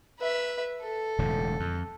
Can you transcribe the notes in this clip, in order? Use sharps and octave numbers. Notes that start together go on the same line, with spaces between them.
B4 E5
A4
E1 A2 D3
F2